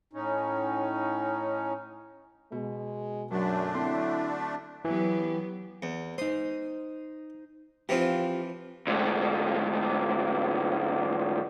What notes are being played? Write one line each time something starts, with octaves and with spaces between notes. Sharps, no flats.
A2 C#4 D#4
B2 G#3
F#2 D3 F#3 A3 D4
C4 E4 A4 C6
E3 F#3 B3 G4
E2
D#4 C5 D#6
E3 F3 C4 F4 G4
D2 G#2